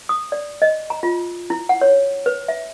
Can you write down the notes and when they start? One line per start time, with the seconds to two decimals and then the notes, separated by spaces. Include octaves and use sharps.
0.09 D#6
0.32 D5
0.62 D#5
0.90 A#5
1.03 F4
1.50 E4
1.69 F#5
1.81 C#5
2.26 B4
2.48 E5